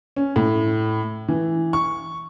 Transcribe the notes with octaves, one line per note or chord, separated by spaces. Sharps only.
C#4
A2
E3
C#6